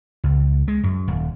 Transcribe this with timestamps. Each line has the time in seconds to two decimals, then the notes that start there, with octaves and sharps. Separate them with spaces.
0.24 C#2
0.68 G#3
0.83 F#2
1.08 D#1